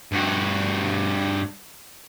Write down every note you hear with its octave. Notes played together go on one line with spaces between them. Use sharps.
G2 F#4